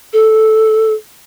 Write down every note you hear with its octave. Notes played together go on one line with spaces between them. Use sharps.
A4